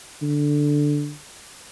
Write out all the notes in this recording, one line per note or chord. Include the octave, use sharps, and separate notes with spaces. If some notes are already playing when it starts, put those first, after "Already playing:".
D3